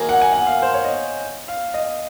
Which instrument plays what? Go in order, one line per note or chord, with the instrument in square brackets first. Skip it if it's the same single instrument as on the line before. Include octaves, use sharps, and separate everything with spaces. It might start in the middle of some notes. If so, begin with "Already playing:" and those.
Already playing: [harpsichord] D#3 F#3 A#3 D#4 G#4 [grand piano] G#5
[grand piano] F#5
G#5
F#5
F5
C5
C#5
D#5
F5
D#5